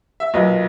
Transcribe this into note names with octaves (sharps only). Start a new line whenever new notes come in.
E5
B1 A#2 B4 D#5